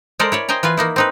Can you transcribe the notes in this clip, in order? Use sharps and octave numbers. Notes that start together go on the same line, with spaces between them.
G#3 A4 A#4 C5 D5
E4 C#5 D5
C5 D#5 G5 G#5 A#5
E3 F4 B4 G#5
A#3 D#4 E4
C4 D#4 B4